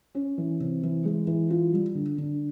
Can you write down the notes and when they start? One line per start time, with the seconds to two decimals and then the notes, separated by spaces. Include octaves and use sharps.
0.15 C#4
0.38 E3
0.60 C3
0.83 E3
1.05 G#3
1.27 E3
1.50 F4
1.73 G3
1.95 D3
2.18 D3